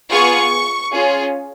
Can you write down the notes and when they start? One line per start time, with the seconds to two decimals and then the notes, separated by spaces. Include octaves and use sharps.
0.10 B3 F4 G#4 C#6
0.93 C#4 F4 G#4